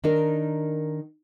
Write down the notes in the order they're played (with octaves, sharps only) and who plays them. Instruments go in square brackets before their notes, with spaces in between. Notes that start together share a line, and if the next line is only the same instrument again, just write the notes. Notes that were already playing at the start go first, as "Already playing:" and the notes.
[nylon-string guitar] D#3 D4 D#4 A#4